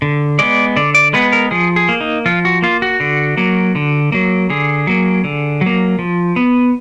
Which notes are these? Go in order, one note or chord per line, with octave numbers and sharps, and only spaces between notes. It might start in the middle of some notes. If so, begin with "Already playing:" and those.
D3
G#3 B3 D5
D3 D5
D5
G#3 B3 B4
A#4
F3 G#4
G#4
A#3
D#4
F3 F4
F#4
A#3 F4
F#4
D3
F#3 A#3
D3
F#3 A#3
D3 G#4
F#3 A#3
D3
F#3
A#3
F3
B3